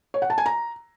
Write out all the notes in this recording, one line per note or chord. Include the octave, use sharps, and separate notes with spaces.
C#5
F#5
A5
G#5
A#5